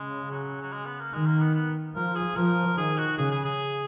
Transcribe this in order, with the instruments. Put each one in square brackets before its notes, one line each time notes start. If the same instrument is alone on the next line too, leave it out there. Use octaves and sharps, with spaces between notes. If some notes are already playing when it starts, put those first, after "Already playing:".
Already playing: [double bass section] C#3 [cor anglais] G#3
[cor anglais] F#3
F#3
G#3
B3
A#3
[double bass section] D#3 [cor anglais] G#3
[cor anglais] A#3
B3
B3
[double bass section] F3 [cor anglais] A#4
[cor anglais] G#4
[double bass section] F3 [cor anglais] A#4
[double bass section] D#3 [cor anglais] G#4
[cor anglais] F#4
[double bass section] C#3 [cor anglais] G#4
[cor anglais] G#4
G#4